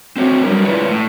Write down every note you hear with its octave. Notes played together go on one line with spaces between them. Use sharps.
C4 F#4 C#5
F#3 G3 D4 A#4
G#3 E4 F4 B4 C#5 D5
A2